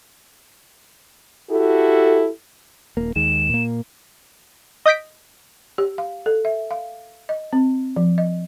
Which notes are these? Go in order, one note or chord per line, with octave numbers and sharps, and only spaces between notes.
E4 F#4 G4 A4
D#1 A#3
D#2 D#3 G#3 E7
A#2 A#3
D#5 D#6 G6 B6 D7
G4
F5
A4
E5
F5
D#5
C4
F3
D#5